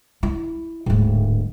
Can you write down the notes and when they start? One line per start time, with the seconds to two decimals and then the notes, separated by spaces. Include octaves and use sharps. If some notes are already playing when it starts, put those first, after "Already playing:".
0.23 E4
0.86 D1 G#2